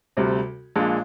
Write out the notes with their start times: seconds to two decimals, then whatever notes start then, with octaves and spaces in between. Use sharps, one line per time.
0.17 D2 C3 G3
0.76 A#1 A#2 G#3 D4